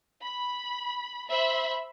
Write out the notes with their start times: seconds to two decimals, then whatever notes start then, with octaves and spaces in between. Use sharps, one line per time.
0.22 B5
1.30 C5 E5 B5